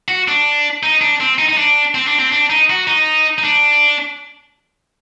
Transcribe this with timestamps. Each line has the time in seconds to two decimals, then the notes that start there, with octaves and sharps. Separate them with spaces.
0.08 F#4
0.28 D4
0.83 D#4
1.01 D4
1.20 C4
1.38 D#4
1.49 D#4
1.57 D4
1.95 C4
2.07 D4
2.19 C4
2.32 D4
2.50 D#4
2.70 F#4
2.87 D#4
3.38 D#4
3.44 D4